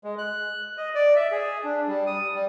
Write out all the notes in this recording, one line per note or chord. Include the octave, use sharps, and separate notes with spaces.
G#3
F#6
D#5
D5
E5
G#4
D4
G3
D#6
G3